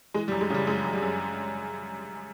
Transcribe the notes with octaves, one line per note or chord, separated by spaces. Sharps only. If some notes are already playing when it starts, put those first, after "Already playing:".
E3 G#3
G3
F#2
G#3
C#3 G3
F#2 G#3
F#2
G3
F#2